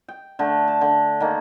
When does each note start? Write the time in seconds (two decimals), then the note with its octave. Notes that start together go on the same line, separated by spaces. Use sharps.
0.08 G5
0.39 D3 A3
0.68 A5
0.81 D3
1.20 D#3 A#3